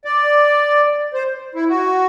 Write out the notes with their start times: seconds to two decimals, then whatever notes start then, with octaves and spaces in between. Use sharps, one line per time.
0.05 D5
1.14 C5
1.55 E4
1.69 F#4